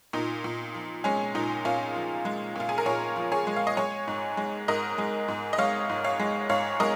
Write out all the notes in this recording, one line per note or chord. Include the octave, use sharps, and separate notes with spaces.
A#2 D#4
A#2
F3
G#3 C#4
A#2 D#4
A#2 C#4 F4
F3
G#3
A#2 F4
G#4
A#4
A#2 G#4 C#5
F3
G#4 C#5
G#3
F5
D#5
G#3 G#4 C#5
G#2
G#3
G#2 A#4 D#5
G#3
G#2
D#5
G#3 C#5 F5
G#2
C#5 F5
G#3
G#2 C#5 F5
G#3 A#4 D#5